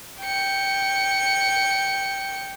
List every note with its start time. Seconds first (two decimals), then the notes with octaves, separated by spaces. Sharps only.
0.21 G5 C#7